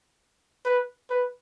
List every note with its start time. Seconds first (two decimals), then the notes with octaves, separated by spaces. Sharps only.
0.65 B4
1.10 B4